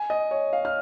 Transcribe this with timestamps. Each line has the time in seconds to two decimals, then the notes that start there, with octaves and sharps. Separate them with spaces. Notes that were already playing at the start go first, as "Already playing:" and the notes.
Already playing: G#5
0.10 D#5
0.31 C#5
0.53 F5
0.65 F6